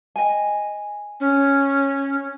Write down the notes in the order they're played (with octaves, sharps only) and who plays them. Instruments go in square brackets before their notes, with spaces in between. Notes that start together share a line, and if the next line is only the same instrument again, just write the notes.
[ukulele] D#5 G5 G#5
[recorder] C#4